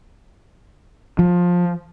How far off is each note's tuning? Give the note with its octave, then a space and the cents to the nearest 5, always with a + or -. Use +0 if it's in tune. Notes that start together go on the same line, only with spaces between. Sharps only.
F3 +15